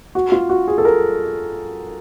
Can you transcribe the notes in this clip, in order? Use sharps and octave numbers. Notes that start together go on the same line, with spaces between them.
F#4
F4
F#4
G#4
A4
A#4